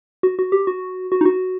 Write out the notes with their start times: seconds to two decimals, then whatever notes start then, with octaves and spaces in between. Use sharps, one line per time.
0.23 F#4
0.39 F#4
0.52 G4
0.67 F#4
1.12 F#4
1.21 D#4
1.25 F#4